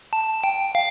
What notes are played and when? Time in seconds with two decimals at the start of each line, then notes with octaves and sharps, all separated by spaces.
0.13 A5
0.44 G5
0.75 F5